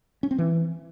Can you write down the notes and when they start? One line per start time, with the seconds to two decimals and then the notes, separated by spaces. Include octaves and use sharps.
0.23 C#4
0.31 C4
0.38 E3